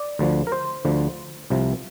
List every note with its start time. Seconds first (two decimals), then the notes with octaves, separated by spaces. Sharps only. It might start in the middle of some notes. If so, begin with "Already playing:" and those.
Already playing: D5
0.19 D2 D3 F3
0.47 A#4
0.52 C5
0.85 D2 D3 F3
1.50 C2 C3 F3